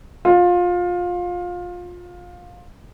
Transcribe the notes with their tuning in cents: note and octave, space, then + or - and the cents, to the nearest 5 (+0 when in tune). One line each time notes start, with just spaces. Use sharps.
F4 +20